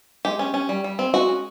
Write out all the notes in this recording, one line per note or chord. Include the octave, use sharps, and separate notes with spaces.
G#3 G4
C#4
C#4
G3
G3
C4
G#3 F#4
C#4